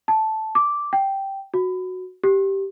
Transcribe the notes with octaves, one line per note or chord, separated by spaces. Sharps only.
A5
D6
G5
F#4
G4